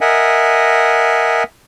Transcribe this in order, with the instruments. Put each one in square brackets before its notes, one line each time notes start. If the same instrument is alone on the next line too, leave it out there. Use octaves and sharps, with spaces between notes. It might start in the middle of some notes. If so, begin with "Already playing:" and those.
[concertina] A#4 D#5 E5 F#5 G#5